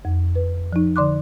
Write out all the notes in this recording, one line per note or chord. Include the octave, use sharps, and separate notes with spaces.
F2
B4
F3 D#4
D3 D5 C6 D6 F#6